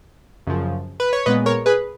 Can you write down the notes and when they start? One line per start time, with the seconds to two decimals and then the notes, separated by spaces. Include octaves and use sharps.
0.47 F#2 C#3 F3
1.00 B4
1.13 C#5
1.26 A#2 G#3 B3 B4 D#5
1.46 A#4 C#5
1.66 G#4 B4